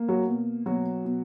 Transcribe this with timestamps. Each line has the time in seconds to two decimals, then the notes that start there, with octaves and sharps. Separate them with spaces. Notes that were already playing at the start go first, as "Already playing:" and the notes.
Already playing: A#3
0.08 F#3 F#4
0.28 B2
0.66 B2 F#3 F#4
1.05 B2